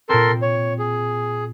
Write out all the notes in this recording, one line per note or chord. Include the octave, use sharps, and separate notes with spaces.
A#2 C4 A4 A#4 C6
C#5
G#4